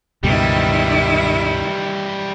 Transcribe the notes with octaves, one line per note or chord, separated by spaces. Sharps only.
C#2 G2 B2 D#3 E3 G3 E4